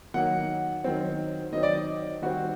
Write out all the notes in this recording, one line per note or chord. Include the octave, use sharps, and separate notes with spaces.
D#3 F#3 A#3 F#5
D#3 F#3 C4
D#3 F#3 C4 D#5
D5
D#5
D#3 G3 C4 F#4